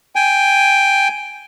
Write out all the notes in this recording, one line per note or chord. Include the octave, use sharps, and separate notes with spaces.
G5 G#5